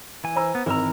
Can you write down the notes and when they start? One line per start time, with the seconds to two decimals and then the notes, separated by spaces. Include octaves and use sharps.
0.24 E3 G#5
0.36 C5 A#5 E6
0.55 B3
0.66 G#1 E3 A#4 A#5 E6